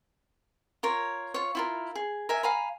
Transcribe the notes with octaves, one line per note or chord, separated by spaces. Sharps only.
F4 A#4 C#5
F4 C#5
E4 F4 A#4
G#4
A#4 E5 G#5
F5 G#5 A#5 B5